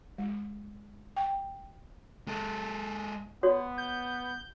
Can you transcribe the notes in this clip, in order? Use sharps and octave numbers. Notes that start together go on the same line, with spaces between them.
G#3
G5
G#3 A4
B3 F#4 C#5
G6